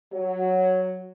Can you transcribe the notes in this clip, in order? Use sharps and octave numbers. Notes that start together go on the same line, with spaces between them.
F#3